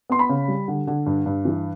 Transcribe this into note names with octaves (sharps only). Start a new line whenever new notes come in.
B3 C6
B5
C#3
G3
D3
D3
G2
G2
E3